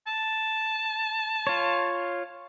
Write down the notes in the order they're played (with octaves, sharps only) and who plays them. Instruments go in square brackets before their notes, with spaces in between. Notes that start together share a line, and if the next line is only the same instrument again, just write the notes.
[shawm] A5
[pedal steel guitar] F4 C#5